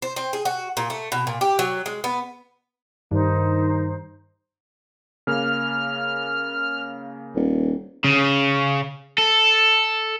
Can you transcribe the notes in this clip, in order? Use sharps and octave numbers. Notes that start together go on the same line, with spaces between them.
C5
C4
G#4
F#4
A#2
A3
B2
A#2
G4
F#3
G#3
B3
G2 D#3 D#4 C5
C#3 A#3 F6
D#1
C#3
A4